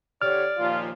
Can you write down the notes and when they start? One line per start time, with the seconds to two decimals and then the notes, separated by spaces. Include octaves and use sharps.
0.22 D3 G4 C#5 D5 F6
0.59 D#2 A#2 F3 F4